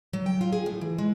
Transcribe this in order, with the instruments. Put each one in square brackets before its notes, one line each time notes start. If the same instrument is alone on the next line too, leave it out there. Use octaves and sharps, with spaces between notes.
[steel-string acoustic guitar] F#3
G5
F4
G#4
A2
E3
G#3